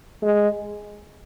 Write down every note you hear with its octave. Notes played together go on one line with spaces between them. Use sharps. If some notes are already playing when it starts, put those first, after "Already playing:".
G#3